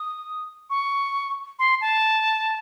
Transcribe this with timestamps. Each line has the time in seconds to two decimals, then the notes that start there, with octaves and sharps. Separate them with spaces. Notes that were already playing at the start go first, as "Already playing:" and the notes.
Already playing: D#6
0.70 C#6
1.59 C6
1.81 A5